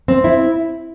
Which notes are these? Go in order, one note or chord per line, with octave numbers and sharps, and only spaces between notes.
C4
E4